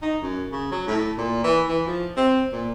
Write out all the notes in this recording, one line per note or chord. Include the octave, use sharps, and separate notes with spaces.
D#4
F#2
C#3
F#3
A2
A#2
E3
E3
F3
C4
A#2